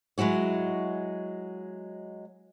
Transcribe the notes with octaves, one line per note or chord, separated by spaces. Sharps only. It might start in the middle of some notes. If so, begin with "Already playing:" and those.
F#3 G#3 E4 F#4 C#5